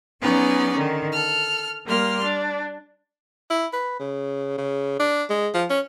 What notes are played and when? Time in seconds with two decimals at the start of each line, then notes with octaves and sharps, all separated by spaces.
0.21 F#3 B3 C#4 D#4 G#4 D5
0.75 D3 D#3
1.11 A4 F6
1.86 G3 A#3 C6 F6
2.23 D4
3.50 E4
3.73 B4
4.00 C#3
4.58 C#3
5.00 D4
5.30 G#3
5.54 F3
5.70 C#4